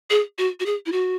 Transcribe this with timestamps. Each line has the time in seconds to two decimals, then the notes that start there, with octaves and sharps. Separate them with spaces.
0.10 G#4
0.38 F#4
0.60 F#4
0.66 G#4
0.86 E4
0.92 F#4